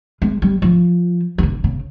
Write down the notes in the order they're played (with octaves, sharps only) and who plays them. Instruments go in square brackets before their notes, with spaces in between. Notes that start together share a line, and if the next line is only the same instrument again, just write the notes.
[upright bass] G#3
G3
F3
D#3
D3
C#3